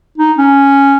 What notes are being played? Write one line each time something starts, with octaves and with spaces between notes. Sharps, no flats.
D#4
C#4